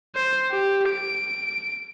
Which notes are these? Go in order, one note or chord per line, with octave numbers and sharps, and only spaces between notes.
C5
G4
D7